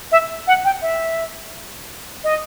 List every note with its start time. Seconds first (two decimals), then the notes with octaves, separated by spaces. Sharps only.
0.12 E5
0.47 F#5
0.65 G5
0.82 E5
2.24 D#5